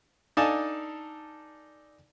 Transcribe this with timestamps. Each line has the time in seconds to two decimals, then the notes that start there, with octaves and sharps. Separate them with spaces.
0.37 D4 D#4 A4 F5 G#5 A5